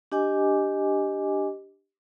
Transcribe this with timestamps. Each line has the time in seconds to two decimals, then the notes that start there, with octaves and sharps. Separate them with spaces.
0.12 D4 G4 D#5 G#5 D6